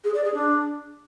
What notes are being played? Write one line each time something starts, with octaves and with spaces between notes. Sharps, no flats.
G#4
D5
G#4
D4